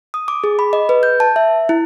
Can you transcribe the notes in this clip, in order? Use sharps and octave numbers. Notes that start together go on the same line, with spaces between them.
D#6
D6
G#4
B5
D#5
B4
G6
A5
E5
E4